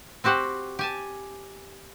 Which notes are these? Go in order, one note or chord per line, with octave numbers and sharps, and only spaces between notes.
C4 F#4 G4 C5 F#5
G4 G#5 A5